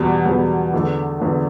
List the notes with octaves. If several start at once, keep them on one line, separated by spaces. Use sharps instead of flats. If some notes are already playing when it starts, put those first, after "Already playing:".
Already playing: E2 B2 G3
E2 B2 G3
E2 D3 A3
E2 D3 A3